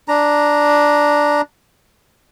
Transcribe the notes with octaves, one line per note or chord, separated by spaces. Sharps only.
D4 A#5